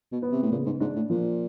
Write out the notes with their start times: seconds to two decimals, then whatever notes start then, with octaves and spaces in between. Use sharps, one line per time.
0.12 B2
0.22 B3
0.32 C3
0.42 A2
0.52 A#2 C#3
0.66 G#2
0.80 G#2 D4
0.96 A2
1.10 A#2 F3